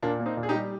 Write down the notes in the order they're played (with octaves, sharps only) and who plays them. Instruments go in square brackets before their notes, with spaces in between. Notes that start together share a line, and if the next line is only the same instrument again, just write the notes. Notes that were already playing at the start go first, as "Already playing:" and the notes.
[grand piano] A#2 [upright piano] A#3 D4
[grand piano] A#3
[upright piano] C4 D#4
[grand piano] A#2
[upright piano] G#4
D#4 G4
[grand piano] G3